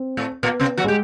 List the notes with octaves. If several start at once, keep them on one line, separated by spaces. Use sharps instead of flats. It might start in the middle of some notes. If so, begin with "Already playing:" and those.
Already playing: C4
A2 A3
A#2 A#3 B3
C3 C4
F#3 F#4
G#3 G4